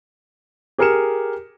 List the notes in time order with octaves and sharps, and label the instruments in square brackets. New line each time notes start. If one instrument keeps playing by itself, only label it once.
[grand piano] G4 G#4 A#4 F6 C#7 E7